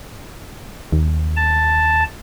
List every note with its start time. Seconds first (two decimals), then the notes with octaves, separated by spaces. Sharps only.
0.92 D#2
1.36 A5